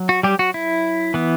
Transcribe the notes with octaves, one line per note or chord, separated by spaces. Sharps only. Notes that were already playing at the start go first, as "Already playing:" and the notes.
Already playing: F#3
F#4
G3 G4
F#4
E4
E3 B3